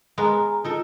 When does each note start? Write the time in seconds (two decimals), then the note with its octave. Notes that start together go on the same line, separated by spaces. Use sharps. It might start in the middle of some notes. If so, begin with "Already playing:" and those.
0.18 G#3 B3 A#4 G#5 A#5
0.64 D#4 F4 A4 A#4